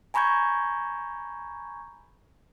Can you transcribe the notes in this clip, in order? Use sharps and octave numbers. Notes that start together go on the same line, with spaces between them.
G#5 A#5 B5 C#6 G6 G#6